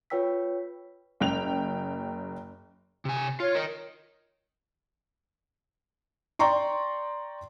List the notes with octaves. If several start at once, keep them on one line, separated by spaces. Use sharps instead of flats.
F4 B4 C#5 G5 E6 B6
F#1 G5 F7
C3 G#5
F4 C#5
A#4 D#5
D5 G5 A#5 C6 C#6